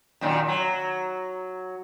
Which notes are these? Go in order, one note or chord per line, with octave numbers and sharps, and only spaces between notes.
F#2 A#2 D#3
F#3